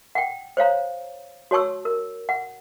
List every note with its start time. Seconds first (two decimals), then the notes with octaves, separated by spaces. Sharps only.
0.15 F#5 G5
0.57 C5 C#5 F5 A#5
1.51 F#4 C#5 A5 C#6 E6
1.85 A#4
2.29 F#5